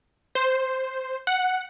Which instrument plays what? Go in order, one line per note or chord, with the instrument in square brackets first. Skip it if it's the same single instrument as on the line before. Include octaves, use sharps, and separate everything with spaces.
[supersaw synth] C5
F#5